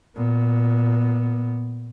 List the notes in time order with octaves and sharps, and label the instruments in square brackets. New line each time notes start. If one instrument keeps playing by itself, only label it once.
[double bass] A#2 B3